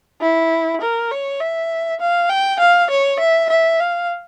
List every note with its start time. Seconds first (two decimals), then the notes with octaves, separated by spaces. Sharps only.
0.21 E4
0.81 A#4
1.11 C#5
1.41 E5
2.00 F5
2.30 G5
2.60 F5
2.90 C#5
3.20 E5
3.50 E5
3.80 F5